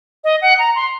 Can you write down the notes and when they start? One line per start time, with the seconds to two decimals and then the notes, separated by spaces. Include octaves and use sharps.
0.24 D#5
0.42 F#5
0.59 A#5
0.75 C6